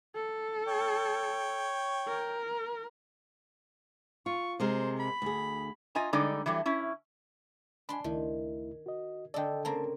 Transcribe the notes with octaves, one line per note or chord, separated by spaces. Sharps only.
A4
C#5 G5
A#4
F4 C#6
C3 G#3 A#4 C5
B5
D2 G#4
F4 D#5 G#5 A#5
D3 G3 G#3 D#4 D5
E3 F#3 G3 A3
C#4 E4
D4 G#5 B5 C6
C#2 D#3 A3 E4
F#4 D#5
D3 A4 D5 D#5 G5
C#3 A#3 C4 A5 A#5